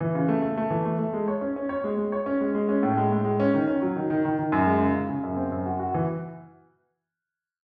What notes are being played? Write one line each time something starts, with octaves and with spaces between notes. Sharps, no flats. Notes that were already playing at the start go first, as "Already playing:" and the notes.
E3
C#3
A3
A3
A3
E3
A3
A3
G#3
C#5
C#4
C#4
C#5
G#3
G#3
C#5
C#4
G#3
G#3
C#4
A2
G#3
A2
G#3
C#4
D#3
C#4
F#3
D#3
D#3
D#3
D#3
F#2
G#3
C#3
C#3
C#3
F#2
C4
F#2
F#4
F#4
E3